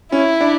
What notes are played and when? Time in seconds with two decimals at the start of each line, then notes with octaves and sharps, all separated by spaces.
0.12 C#4 E4
0.41 D4